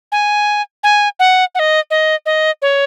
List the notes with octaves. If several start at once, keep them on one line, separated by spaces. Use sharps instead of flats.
G#5
G#5
F#5
F#5
D#5
D#5
D#5
C#5